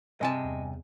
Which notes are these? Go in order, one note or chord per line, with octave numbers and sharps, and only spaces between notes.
G2 C3 D#5 G#5 A5
E2